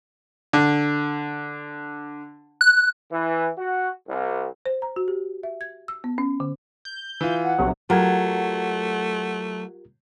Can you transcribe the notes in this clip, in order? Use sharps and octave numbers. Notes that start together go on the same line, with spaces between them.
D3
F#6
E3
F#4
C2
C5
A#5
F#4
G4
E5
G#6
E6
B3
C#4
D3
G6
E3 F4
F#5
B1 C3 F#3
F#3 A3 F4 G4 A#4 F#5 G#6